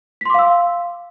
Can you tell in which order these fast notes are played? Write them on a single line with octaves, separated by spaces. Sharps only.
B6 C6 D6 F5 E6